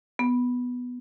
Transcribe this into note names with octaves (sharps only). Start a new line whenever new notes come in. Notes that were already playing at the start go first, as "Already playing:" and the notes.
B3